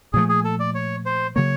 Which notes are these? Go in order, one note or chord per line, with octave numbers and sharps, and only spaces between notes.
A#2 F3 A3 G#4
G#4
A4
D5
C#5
C5
C#3 F#3 A#3 C#5